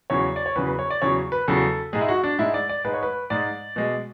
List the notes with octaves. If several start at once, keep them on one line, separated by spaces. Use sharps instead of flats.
E2 C#3 F#3 C#5
D5
C#5
E2 C#3 F#3 B4
B4
C#5
D5
E2 C#3 F#3 C#5
B4
E2 C#3 F#3 A4
G#2 G#3 G#4
E4
F#4
D4
G#2 G#3 E4
D5
D5
G#2 G#3 B4
C#5
B4
G#2 G#3 D5
B2 G#3